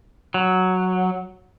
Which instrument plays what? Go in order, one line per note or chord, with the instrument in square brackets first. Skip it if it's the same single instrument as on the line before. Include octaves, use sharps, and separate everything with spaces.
[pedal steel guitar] F#3